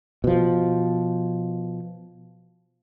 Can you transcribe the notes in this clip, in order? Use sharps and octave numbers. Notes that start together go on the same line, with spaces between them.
B2 F3